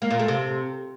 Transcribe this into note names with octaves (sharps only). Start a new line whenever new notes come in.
A#3
A#2
A3
C3